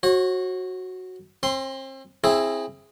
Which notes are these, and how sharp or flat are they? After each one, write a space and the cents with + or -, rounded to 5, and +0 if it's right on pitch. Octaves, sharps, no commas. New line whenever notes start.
F#4 +0 C#5 -45
C4 +40 C6 +0
C4 +25 E4 +0 G#4 +0